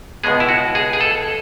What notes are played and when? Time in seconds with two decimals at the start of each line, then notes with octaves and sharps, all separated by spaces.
0.23 C#2 B2 G#3 B3 G#4
0.40 E4
0.49 F#4
0.75 G#4
0.93 G#4
1.01 A4